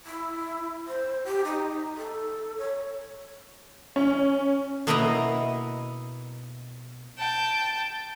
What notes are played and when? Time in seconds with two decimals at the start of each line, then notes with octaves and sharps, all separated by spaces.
0.06 E4
0.88 C5
1.25 G4
1.45 D#4
1.97 A4
2.59 C#5
3.96 C#4
4.87 B2 A#3 E4 A#4 D#5 A#5
7.18 G5 A5